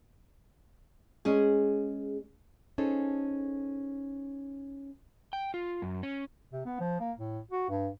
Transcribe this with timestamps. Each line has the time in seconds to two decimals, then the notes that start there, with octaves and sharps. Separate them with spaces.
1.25 G#3 C#4 G#4
2.78 C#4 D#4 G#4 A4 C5
5.33 G5
5.54 F4
5.82 F#2
6.03 C#4
6.53 C3
6.66 B3
6.80 F3
7.00 A#3
7.19 A2
7.51 F#4
7.70 G2